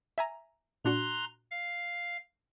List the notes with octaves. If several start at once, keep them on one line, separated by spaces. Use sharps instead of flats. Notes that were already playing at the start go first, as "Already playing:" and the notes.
E5 G#5 A#5
A#2 D4 F#4 A#5 C6 F#6
F5